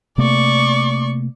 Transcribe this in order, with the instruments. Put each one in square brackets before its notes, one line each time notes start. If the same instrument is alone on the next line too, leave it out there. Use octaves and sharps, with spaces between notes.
[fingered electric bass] C3 A3 A#3 [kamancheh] D5 C#6